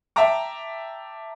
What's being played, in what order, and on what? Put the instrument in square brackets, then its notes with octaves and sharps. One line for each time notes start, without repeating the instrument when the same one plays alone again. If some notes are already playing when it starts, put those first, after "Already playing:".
[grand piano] E5 G5 A5 A#5 D6